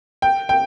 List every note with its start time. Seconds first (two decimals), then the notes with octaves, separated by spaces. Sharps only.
0.22 G5
0.49 G5